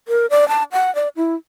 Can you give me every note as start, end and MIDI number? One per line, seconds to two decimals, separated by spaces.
0.08 0.26 70
0.30 0.47 74
0.48 0.63 81
0.72 0.93 78
0.95 1.08 74
1.16 1.35 64